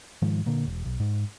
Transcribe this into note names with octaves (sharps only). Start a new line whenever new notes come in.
G#2 D#3 F3 G#3
A#2 D3 A#3
E1
B1
G#2